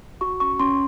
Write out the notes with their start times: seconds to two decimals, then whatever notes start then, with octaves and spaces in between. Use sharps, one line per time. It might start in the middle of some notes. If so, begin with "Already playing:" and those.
0.21 F#4 C#6
0.40 C#4 C#6
0.60 C#4 C6